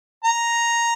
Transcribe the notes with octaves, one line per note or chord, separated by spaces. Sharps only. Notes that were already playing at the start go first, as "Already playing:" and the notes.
A#5